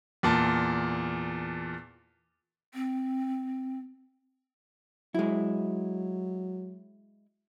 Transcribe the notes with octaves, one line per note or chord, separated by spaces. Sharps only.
E2 A#2 A5
C4
F#3 G#3 E4